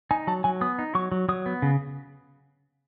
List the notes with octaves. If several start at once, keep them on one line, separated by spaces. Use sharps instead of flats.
D#4 G#5
F#3 A5
F#3 G#5
B3 D#6
D#4
F#3 C#6
F#3
F#3 D#6
B3
C#3